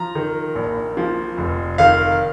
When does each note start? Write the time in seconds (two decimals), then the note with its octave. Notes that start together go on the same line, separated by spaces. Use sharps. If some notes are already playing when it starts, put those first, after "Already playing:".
Already playing: F3 A#5
0.15 D#3
0.55 A#1
0.97 F3
1.37 F1
1.78 D#3 F5